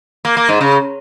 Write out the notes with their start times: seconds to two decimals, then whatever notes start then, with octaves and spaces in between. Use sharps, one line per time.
0.25 A#3
0.37 A#3
0.49 G#2
0.61 C#3